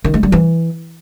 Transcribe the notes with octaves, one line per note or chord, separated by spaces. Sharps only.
D#3
G#3
G3
E3